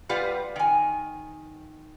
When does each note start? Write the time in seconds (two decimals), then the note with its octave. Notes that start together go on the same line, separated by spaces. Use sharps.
0.09 G3 F4 B4 F5 F#5
0.56 D#3 G#5